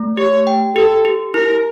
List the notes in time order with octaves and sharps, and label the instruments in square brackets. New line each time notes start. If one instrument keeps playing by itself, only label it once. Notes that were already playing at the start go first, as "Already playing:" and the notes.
Already playing: [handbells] A3
[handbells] G4 [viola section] C#5
[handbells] G5
[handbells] G4 [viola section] A4
[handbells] G4
[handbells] E4 [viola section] A#4